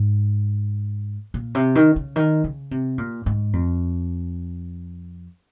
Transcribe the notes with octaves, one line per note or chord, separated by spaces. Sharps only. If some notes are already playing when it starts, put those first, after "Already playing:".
Already playing: G#2
A#2
C3
D#3
C#3
D#3
C#3
C3
A#2
G#2
F2